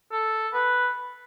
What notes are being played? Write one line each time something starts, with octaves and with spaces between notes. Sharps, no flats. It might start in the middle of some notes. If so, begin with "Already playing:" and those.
A4
B4